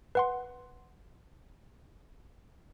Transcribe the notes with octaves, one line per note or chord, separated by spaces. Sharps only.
B4 F#5 C6